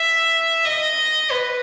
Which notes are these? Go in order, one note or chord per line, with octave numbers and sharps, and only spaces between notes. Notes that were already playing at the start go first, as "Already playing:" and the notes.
Already playing: E5
D#5
B4